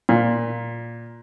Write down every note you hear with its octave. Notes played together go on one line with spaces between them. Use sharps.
A#2